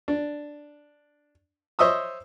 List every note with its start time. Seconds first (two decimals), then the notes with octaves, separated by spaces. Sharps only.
0.08 D4
1.79 C5 C#5 D#5 E5 D#6 E6